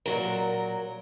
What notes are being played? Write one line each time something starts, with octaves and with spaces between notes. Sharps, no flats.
A#2 F#3 A#4